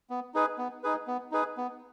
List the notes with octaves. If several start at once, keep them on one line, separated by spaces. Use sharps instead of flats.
B3
D#4 G#4 B4
B3
D#4 G#4 B4
B3
D#4 G#4 B4
B3